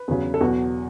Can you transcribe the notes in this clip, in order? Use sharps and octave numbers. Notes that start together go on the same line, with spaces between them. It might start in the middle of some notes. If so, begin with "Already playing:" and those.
Already playing: B4
E2 C#3 F#3
A4
E2 B2 F#3 F#4